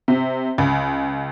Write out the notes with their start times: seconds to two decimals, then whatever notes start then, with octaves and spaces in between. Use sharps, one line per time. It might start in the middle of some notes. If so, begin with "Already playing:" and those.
0.08 C3
0.58 C#2